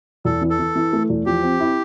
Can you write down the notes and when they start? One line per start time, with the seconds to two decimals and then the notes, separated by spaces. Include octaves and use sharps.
0.25 E2 A4
0.42 E3
0.50 A4
0.59 E3
0.75 E3
0.93 A3
1.10 E2
1.26 F3 G4
1.43 C4
1.60 E4